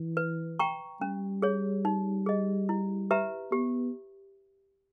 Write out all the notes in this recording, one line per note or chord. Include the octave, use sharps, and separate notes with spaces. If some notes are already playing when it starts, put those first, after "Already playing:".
Already playing: E3
B4
G5 A#5 C#6
G3 C#4
G#4 C#5
D#4
G#4 D#5
E4
G4 B4 E5 A#5
B3 G4